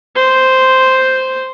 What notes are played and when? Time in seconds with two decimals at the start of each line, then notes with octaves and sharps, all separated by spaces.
0.16 C5